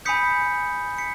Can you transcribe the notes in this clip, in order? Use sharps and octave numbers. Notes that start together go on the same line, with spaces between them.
G#5 B5 D#6 G6 B6 C#7
B6 C#7